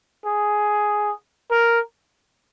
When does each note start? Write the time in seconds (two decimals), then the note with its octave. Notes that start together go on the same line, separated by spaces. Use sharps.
0.26 G#4
1.50 A#4